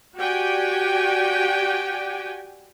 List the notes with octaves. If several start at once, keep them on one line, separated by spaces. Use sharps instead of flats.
F#4 G4 D5 G5 G#5